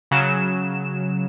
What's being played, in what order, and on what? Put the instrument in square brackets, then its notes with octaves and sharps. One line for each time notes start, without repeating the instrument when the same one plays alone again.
[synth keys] C#3 F#3 E7